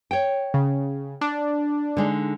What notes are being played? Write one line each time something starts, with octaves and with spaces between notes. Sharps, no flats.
C#5 G5
C#3
D4
D3 G#3 D#4